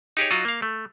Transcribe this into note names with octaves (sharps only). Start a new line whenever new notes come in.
D#4 G4 G#4 C#5
F#3 D#4 F4 F#4 D#5
A#3 F5
A3